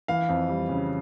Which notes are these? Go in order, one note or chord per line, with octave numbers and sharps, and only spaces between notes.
E3 F5
F2
G3
C#3